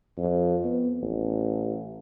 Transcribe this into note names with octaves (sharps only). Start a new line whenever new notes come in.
F2
B3
A1